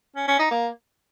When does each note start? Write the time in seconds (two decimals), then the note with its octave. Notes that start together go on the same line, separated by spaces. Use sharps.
0.16 C#4
0.28 C#4
0.39 D#4
0.51 A#3